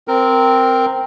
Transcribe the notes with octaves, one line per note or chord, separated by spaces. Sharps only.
C4 A#4